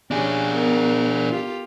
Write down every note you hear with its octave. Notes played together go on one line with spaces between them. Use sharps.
C#4 D4 G4 G#4
B3 A#4
F4 G4 A4